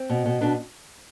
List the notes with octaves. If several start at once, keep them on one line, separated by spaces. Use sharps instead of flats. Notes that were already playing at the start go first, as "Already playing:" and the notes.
Already playing: C4
B2
B2
B2 D4